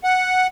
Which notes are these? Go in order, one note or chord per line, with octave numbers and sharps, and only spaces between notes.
F#5